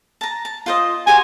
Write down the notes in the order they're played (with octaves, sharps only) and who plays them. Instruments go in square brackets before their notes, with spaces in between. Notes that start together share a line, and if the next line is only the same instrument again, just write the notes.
[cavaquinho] A5 A#5
A5
F4 C5 D#5
[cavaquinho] F#4 G4 C5 [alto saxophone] G#5